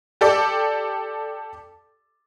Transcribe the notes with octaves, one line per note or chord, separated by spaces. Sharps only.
G4 A4 D5